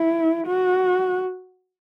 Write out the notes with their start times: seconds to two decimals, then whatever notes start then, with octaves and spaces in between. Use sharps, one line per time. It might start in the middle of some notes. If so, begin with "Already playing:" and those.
Already playing: E4
0.48 F#4